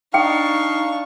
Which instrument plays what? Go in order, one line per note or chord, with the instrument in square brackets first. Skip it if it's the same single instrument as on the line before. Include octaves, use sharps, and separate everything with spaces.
[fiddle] D4 C#6 [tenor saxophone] D#4 [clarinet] F5 [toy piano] G5